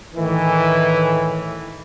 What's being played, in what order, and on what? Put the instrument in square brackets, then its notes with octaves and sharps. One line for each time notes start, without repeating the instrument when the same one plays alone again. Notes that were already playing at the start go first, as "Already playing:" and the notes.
[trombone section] A2 D#3 E3